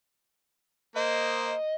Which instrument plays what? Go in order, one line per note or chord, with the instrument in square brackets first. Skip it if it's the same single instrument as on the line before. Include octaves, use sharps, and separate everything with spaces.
[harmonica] A#3 C5 [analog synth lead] D#5